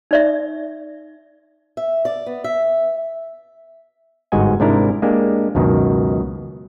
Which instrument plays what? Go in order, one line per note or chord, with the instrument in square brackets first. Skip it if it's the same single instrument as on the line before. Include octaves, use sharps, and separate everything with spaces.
[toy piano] D#4 D5 E5
[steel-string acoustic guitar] E5
D5
B3
E5
[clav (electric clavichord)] G1 G#2 F#4 D#5 G#5
G#2 C3 D4 E4 A#4
G#3 A#3 D4 G4
C#2 F#2 B2 D#3